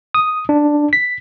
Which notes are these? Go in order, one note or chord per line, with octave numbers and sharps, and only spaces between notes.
D#6
D4
B6